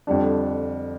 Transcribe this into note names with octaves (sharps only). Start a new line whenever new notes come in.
F2 D3 G3 D4